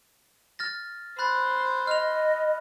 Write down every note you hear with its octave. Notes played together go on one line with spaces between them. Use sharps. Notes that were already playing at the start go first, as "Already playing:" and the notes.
F6 A6 A#6
C5 B5 F#6 A6
D#5 F6 F7